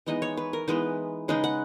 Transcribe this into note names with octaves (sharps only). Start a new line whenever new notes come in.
E3 G#3 B3 D#4 D#5
C#5
B4
A#4
E3 G#3 B3 D#4 B4
C#3 G#3 D#4 B4
F#5